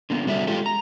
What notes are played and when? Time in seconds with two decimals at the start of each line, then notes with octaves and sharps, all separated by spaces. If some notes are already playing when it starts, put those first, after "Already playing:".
0.10 D3 A#3 B3
0.26 C3 G3 F#4 A4 D5 E5
0.47 G#3 F4 G4 A4
0.66 A#5